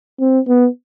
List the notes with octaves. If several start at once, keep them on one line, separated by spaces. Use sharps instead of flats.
C4
B3